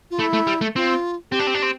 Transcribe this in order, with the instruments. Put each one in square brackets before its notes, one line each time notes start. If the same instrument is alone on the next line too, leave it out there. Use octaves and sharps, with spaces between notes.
[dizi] F4
[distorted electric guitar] A3 [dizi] E4
[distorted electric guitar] A3
G3
A3
[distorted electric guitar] C4 [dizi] F4
[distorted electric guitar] C4 [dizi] G4
[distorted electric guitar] D4
C4
D4
C4